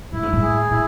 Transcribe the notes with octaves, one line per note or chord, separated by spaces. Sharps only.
A2 E4
G#2
A2
G#4
A2 E4